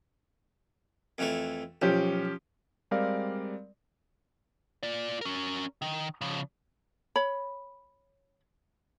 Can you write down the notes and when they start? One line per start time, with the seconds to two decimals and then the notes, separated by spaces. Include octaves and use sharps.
1.18 F2 E3 A3
1.82 B1 F3 C#4 G4
2.91 G3 G#3 C4 A#4 D5 F5
4.83 F4 D5
5.21 C#4 A#4
5.82 D#3
6.21 C#3 F3
7.16 C#5 B5